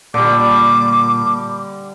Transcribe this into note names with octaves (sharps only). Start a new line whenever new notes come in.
A#2 D3 G3 D6